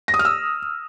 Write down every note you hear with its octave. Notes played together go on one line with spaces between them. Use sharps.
A#6
D#6
F6
E6